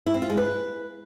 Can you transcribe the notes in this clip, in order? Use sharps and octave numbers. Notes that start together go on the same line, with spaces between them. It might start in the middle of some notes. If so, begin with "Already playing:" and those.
E4
C4
F4
G#3
B4